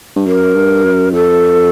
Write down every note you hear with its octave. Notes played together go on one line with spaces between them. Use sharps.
G2
F#2 A#4
G2
F#2
F2 A4